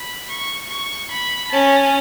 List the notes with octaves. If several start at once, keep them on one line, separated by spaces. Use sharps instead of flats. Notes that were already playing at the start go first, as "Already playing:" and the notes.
Already playing: B5
C#6
C#6
B5
C#4 A5